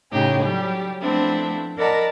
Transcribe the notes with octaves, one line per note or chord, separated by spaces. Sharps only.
A2 C#3 D#4 G4 G#4
F#3 G3 G4
F3 A3 B3 C4 D4 E4
A#4 D5 D#5 F#5 A5 B5